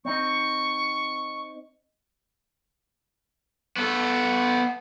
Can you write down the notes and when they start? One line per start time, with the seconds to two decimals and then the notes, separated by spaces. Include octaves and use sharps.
0.05 C4 D#4 C#6
3.76 B3 A4